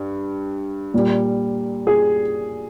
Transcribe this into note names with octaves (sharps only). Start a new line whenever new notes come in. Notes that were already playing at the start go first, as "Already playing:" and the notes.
Already playing: G2
A#2 G3
G#4